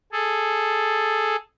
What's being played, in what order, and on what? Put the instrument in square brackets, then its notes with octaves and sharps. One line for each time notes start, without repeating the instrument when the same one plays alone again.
[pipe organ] G#4 A4